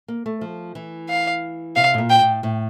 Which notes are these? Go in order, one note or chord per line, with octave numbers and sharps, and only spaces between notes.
A#3
A3
F3
E3
F5
C3 F5
A2
A#2
G5
A2
A2